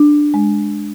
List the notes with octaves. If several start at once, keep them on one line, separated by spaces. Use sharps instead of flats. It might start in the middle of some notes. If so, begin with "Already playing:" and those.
Already playing: D4
G#3